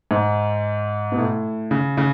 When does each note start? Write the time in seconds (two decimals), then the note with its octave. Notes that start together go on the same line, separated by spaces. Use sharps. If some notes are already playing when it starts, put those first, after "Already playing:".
0.11 G#2
1.12 B2
1.18 A2
1.71 C#3
1.97 C#3